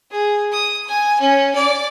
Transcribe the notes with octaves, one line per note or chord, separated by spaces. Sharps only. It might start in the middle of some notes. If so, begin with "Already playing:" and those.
G#4
D#6
G#5
C#4
D5